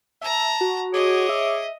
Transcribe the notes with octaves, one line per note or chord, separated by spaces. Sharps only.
E5 A5 A#5
F#4
G#4 C#5 D#5 D6
E5